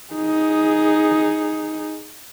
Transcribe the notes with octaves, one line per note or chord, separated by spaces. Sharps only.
D#4 G#4